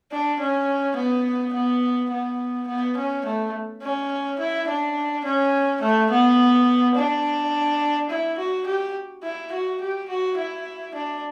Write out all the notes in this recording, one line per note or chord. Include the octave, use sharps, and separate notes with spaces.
D4
C#4
B3
B3
B3
B3
C#4
A3
C#4
E4
D4
C#4
A3
B3
D4
E4
F#4
G4
E4
F#4
G4
F#4
E4
D4